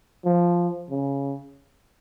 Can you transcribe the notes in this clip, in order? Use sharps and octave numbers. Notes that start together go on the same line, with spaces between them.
F3
C#3